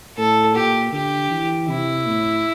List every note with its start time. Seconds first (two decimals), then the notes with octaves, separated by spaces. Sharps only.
0.17 A2 A4
0.54 A#2 G4
0.92 D3 G4
1.31 E3
1.68 C3 E4
2.07 A2